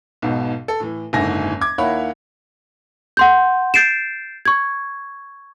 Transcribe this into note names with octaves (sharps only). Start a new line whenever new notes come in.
B1 G#2 B2
A4
A2 E3
F#1 G#2 D3 E4 G#5 A#6
D6 G#6
D#2 A#3 E4 C#5 F#5 B5
F#5 C6 G6
G6 A6 C7 D7 E7
C#6 G#6